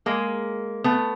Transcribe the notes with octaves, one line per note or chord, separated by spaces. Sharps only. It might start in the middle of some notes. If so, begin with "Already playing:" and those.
G#3 A#3
A3 B3